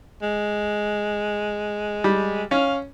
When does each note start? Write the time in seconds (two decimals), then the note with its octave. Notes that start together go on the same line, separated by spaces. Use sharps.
0.22 G#3
2.04 G3
2.51 C#4 F5